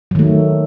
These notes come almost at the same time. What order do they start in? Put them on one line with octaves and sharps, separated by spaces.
F#3 D#3 A3